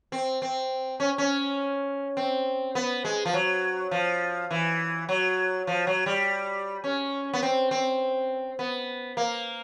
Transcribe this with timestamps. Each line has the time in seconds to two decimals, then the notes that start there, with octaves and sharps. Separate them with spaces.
0.12 C4
0.42 C4
1.00 C#4
1.18 C#4
2.17 C4
2.75 B3
3.05 G#3
3.25 F3
3.33 F#3
3.91 F3
4.51 E3
5.09 F#3
5.67 F3
5.87 F#3
6.06 G3
6.84 C#4
7.33 B3
7.43 C4
7.71 C4
8.59 B3
9.17 A#3